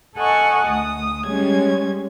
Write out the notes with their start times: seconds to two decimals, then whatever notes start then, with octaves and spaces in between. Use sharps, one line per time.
0.16 A4 D#5 F#5 G#5 A5 C#6
0.68 D2 D#6
1.26 G3 G#3 C#4 G#6